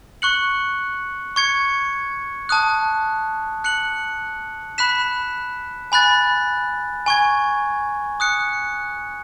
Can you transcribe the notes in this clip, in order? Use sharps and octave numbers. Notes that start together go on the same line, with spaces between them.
C#6 F#6 C#7 F#7
C#6 G#6 C#7
A5 D#6 F#6
F#6 C#7 F#7
B5 F#6 B6 E7
G#5 B5 F#6 A6
G#5 C#6 G#6
D#6 F#6 C#7